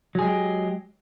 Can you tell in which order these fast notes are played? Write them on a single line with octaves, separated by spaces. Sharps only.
F#3 G#4 G#3 G4